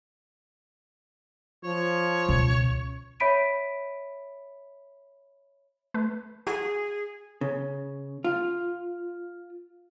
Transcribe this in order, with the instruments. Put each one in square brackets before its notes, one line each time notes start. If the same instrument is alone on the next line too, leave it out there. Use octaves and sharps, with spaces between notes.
[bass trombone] F3 [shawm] C#5
[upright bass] C#2 B2
[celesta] C#5 E5 B5 B6 D7 D#7
[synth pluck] A3 B4
[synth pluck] E4 F#4 A4 [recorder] G#4
[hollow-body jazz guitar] C#3
F4